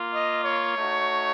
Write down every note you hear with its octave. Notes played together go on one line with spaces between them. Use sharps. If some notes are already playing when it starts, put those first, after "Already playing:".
Already playing: A#3 F4
D#5
C#5
A3 D#4 F#4